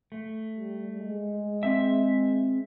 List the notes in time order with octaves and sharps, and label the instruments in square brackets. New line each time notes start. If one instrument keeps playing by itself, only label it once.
[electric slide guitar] A3
[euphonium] G3
G#3
[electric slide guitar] C4 E5